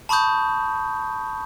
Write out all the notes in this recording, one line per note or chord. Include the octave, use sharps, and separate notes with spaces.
A5 B5 C#6 D#6 G6